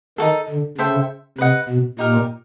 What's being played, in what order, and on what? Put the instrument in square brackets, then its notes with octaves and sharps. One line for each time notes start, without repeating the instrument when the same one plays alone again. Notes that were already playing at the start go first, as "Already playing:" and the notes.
[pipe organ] D#3 [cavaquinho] D#4 F#4 A4
[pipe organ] D3
[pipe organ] C#3 [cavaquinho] A4 C5 E5 G5
[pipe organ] C3 [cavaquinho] B4 D#5 F#5
[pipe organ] B2
[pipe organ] A#2 [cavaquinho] D#4 G4 A#4